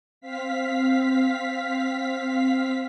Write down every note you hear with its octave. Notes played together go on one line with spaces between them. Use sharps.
C4 F5 B6